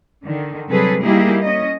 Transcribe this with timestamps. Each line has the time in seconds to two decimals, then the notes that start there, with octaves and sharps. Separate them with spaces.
0.25 D3 D#3
0.69 C3 F#3 G3 G#4 A4 B4
1.03 G3 A#3 D#4 E4 G4 G#4
1.42 C#4 D#5